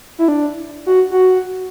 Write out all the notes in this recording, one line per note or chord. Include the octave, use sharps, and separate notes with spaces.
E4
D4
F#4
F#4